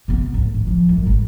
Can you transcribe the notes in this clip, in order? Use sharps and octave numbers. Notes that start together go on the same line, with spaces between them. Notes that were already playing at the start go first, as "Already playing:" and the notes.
C3 B3
D2 G#2
D#3
F3
A1 F#2
G#1 G#2